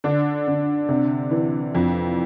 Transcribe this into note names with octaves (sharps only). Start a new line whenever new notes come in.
D3 D4
D3
C3
E3
F2